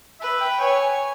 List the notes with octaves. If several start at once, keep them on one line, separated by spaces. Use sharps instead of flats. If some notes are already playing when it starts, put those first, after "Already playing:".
B4 E5
G5
C#5 G#5